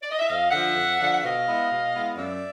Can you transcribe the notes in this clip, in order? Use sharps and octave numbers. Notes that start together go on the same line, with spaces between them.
D5
D#5
E5
F2 D#5 F5
D3 F3 E5 F#5
F2
D3 F3
F#5
B2 D#5 F5
G#3 B3 E4
B2
G#3 B3 E4
F#2 D5 E5